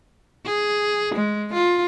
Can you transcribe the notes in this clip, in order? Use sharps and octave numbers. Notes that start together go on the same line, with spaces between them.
G#4
G#3
F4